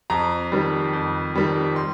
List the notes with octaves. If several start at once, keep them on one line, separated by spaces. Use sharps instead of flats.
F2 A#5
D#3 G3
F2
D#3 G3
C6